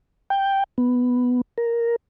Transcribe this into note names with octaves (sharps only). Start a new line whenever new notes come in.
G5
B3
A#4